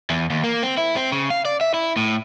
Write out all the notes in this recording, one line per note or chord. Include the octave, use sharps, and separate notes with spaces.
E2
D#2
A#3
C4
E4
C4
C#3
F5
D5
E5
E4
A2